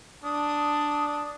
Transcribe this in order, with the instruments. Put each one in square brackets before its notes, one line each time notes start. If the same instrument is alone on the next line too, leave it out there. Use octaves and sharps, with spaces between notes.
[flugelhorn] D4 [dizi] D#6